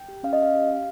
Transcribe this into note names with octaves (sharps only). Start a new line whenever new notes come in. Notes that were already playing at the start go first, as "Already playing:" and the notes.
Already playing: G5
G4
C#4 F5
D#5
C#4 F5
G4
G4